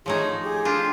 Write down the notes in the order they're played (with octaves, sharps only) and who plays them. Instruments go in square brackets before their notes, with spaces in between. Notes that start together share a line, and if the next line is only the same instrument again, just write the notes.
[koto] F3 A3 D#4 [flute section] G#4 C#5
[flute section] G4 G#4 D6
[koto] D4 F4